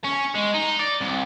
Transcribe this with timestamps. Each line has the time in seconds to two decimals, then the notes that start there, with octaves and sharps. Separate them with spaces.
0.04 C#4
0.35 G#3
0.54 D#4
0.79 D5
1.01 C2